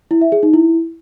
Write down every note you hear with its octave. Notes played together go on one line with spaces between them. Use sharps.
E4
E5
G#4
D#4
E4